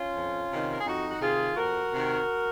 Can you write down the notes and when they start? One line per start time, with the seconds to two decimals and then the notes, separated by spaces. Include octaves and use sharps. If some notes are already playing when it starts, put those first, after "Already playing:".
Already playing: C#4 F4
0.15 F2
0.51 C3 D#3
0.70 A#4
0.78 G#4
0.86 F2 D#4 F#4
1.10 F#4
1.21 C3 D#3 F4 G#4
1.56 F2 F#4 A#4
1.92 C3 D#3